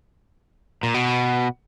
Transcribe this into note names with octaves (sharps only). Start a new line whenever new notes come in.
A#2
B2